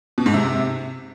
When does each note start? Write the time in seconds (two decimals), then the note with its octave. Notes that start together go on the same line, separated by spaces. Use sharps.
0.18 B2
0.26 G#2
0.34 C3